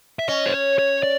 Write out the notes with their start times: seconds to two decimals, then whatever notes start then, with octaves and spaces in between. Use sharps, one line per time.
0.19 E5
0.28 C#4 D#5
0.46 C5
0.54 C#5
0.79 C#5
1.03 D5